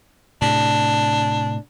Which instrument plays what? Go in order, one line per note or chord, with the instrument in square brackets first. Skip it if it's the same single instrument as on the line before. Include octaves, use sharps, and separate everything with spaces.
[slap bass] A2 C3 [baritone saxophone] D4